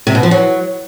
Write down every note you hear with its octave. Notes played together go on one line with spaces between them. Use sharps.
C3
B2
F3
F#3